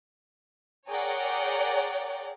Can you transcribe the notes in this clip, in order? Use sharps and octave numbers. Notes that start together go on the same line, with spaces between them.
G#4 A#4 C#5 D5 F#5 G5